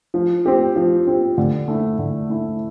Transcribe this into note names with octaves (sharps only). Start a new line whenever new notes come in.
F3
C4 G4
F3
C4 G4
D3
A3 E4
D3
A3 E4